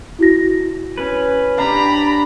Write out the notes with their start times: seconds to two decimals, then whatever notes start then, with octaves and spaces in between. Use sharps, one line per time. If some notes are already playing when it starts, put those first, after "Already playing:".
0.19 E4 F#4 A#6
0.98 C#4 B4
1.58 D4 G4 A#5 B5